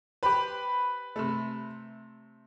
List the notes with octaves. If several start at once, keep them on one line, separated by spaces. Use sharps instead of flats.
G4 B4 C5 B5
C3 A3